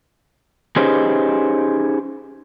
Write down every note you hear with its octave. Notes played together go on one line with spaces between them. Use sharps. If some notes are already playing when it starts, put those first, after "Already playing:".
C#4 D#4 G4 G#4 B4 C5